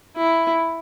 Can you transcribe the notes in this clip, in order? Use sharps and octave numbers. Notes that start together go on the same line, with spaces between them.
E4